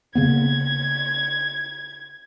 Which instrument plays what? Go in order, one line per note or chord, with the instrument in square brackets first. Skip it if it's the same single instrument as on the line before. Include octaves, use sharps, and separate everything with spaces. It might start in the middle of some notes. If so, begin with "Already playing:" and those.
[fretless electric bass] C#3 A#3 B3 [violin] G#6